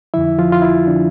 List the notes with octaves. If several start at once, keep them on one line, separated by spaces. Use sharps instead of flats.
F2 D3 F3 E4 E5
F3 F4
F4
E4
D3 F3 D4